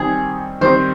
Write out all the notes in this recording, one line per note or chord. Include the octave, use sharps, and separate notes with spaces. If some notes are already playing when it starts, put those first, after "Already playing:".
Already playing: D#3 G3 C4 D#4 G#4
D#3 G3 C4 D#4 C5